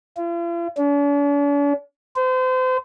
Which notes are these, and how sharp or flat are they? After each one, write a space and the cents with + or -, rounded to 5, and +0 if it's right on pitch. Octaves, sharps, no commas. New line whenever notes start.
F4 -45
D4 -45
C5 -35